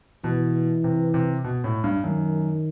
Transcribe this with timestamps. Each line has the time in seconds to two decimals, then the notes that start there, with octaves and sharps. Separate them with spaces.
0.24 B2 E3
0.84 C3
1.14 C3
1.44 B2
1.64 A2
1.84 G2
2.04 F#2 D#3